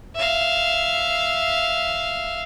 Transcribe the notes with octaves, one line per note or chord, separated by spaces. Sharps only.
E5 F5